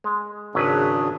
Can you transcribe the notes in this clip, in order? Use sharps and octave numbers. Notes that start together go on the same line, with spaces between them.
G#3
G#1 C#3 F#3 D4 G#4 B4